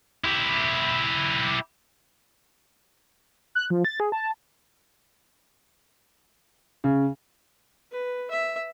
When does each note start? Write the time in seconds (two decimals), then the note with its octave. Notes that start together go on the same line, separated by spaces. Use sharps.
0.24 E4 G4
3.55 F#6
3.70 F3
3.85 A6
4.00 G#4
4.12 A5
6.84 C#3
7.92 B4
8.31 E5